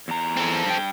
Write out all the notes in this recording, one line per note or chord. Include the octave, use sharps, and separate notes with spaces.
E2 A#5
C4 A4
G2 G5